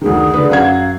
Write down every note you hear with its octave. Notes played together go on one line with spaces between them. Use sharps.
D2 D#3 G#4
D3 B4
F#2 F5 F#5 G#6